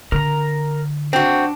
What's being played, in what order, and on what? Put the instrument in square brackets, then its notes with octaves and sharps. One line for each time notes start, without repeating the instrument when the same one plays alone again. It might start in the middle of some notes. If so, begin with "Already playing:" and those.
[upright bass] D3 [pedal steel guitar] A#4 A#5
[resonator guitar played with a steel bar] C4 F#4 [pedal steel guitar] D4